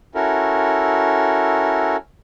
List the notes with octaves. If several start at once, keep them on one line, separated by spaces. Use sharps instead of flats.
C#4 E4 F#4 A4 A#4